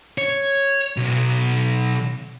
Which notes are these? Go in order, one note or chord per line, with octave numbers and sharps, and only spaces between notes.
C#5
B1